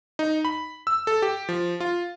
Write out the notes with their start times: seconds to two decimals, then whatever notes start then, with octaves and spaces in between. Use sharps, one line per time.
0.19 D#4
0.45 B5
0.87 E6
1.07 A4
1.22 G4
1.49 F3
1.80 F4